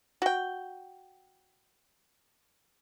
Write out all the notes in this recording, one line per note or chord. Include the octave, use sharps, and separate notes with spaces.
F#4 G5